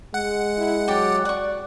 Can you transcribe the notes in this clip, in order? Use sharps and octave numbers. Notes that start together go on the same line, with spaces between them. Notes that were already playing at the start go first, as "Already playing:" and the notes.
G#3 F#5
E4
F#3 G4 D5 G5
D5 F#5 C#6